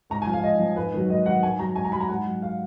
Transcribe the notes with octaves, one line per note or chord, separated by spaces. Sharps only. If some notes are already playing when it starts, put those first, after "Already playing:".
G#2 A#5
G#5
F3
F5
G#2 D#5
F3
G#2 B4
D#3 F#3
G#2 D#5
D#3 F#3 F#5
G#2 G#5
F#3 A#5
G#2 G#5
A#5
F#3 B5
A#5
G#2 F#5
F#3
F5